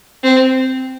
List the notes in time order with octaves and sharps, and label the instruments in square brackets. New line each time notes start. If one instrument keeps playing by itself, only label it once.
[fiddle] C4